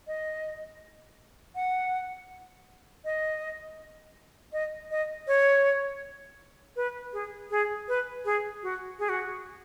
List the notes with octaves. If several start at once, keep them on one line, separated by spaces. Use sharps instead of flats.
D#5
F#5
D#5
D#5
D#5
C#5
B4
G#4
G#4
B4
G#4
F#4
G#4
F#4